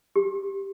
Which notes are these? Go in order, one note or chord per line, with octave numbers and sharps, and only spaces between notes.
G4